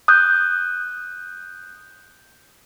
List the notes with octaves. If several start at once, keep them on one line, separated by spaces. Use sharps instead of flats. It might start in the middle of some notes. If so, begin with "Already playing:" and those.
D#6 F#6 G6